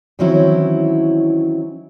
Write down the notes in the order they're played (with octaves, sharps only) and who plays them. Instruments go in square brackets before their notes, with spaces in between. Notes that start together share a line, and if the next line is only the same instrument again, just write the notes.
[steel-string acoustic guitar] D#3 E3 F#3 C4 C#4 E4